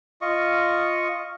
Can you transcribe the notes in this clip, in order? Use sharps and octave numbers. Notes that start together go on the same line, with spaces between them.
F4 D#5 C#6